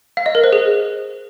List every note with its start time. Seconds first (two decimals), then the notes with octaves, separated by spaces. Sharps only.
0.17 F5
0.26 D#5
0.35 A#4
0.44 C5
0.53 G#4